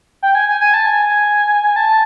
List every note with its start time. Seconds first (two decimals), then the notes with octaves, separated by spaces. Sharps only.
0.23 G5
0.35 G#5
0.48 G#5
0.61 G#5
0.74 A5
0.86 G#5
1.76 A5